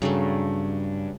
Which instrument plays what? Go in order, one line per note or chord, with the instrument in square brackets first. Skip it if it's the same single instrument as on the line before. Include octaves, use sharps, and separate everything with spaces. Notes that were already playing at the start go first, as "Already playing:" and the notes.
[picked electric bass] G2 [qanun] C#3 F#3 A3